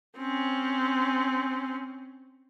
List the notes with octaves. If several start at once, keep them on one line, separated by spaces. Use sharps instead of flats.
C4 C#4